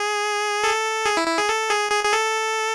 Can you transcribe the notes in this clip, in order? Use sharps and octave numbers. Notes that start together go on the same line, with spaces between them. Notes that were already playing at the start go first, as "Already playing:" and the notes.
Already playing: G#4
A4
G#4
E4
E4
G#4
A4
G#4
G#4
G#4
A4